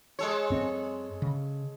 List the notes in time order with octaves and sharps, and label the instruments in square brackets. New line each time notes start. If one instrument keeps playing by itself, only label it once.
[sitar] G#3 A4 C#5
[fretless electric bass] F#2 C4
C#3